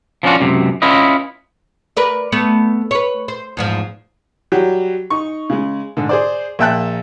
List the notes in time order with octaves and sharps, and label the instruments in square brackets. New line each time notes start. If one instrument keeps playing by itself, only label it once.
[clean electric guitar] F3 B3 C#4 D4 F4 F#4
C#2 F#2 C3
C#4 E4 F4 B4 D#5
[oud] A#4 B4 D5
A3 B3
B4 C#5
C5
E2 G#2 F3
[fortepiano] F#3 G3 F#4 G4
D#4 C#6
C#3 G#3
G#2 D3
G#4 C5 D5
A#1 A#3 E5 G5 A5 F#6